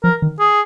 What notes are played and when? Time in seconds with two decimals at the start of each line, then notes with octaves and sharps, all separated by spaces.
0.03 F3 A#4
0.22 D#3
0.40 G#4